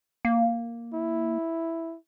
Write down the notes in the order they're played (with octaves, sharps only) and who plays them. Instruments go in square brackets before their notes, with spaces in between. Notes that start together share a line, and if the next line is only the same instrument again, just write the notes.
[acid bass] A#3
[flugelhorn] E4